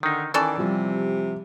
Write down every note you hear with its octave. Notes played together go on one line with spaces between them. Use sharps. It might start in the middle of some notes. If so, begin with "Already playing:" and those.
D3 D#3 D#4
D#3 E3 C#4 A4 D5
C3 F3 G3